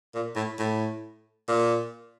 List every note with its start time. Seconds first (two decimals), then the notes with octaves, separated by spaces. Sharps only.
0.14 A#2
0.35 A2
0.59 A2
1.48 A#2